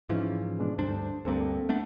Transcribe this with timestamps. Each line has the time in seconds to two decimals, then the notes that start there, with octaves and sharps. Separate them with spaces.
0.09 G#2 E3 F3 C#4 D#4 E4
0.59 B2 G#3 D4
0.78 D2 G2 D4 C5
1.25 D2 G2 A#3 C4 A4
1.69 A3 B3 D4